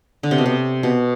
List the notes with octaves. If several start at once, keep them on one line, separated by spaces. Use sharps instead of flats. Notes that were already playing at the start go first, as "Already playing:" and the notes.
D3
C3
B2
C3
B2